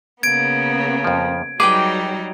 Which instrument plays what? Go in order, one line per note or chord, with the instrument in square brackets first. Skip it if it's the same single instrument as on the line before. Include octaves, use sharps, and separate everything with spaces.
[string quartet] C#3 A#3 B3 [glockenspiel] G#6 D7
[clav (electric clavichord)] F2 F3
[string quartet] F#3 G3 D#4 [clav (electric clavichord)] G#4 B4 [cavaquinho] G5 D6